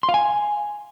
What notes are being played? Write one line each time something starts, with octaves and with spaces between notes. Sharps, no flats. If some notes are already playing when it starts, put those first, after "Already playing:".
C6
F5
G#5